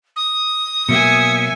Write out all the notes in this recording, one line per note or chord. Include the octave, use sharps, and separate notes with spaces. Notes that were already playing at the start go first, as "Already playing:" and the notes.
D#6
B2 F#3 A#3 E5 G#5 C#7